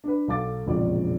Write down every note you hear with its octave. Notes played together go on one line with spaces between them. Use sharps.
D4 B4
B1 A4 F5 D6 A6
E1 A#1 F2 C#3 F3 D5